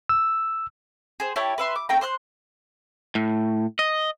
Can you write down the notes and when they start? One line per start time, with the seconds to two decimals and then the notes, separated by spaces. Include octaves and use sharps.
0.09 E6
1.20 G#4 C5
1.36 E4 G4 C#5 A5
1.58 B4 E5 C6
1.76 D6
1.89 A3 C4 G5 A#5
2.01 C5 C6 F#6
3.15 A2
3.79 D#5